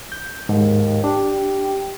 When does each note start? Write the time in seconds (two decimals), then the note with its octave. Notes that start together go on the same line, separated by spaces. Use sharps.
0.12 G6
0.49 D#2 G#2
1.04 D4 G4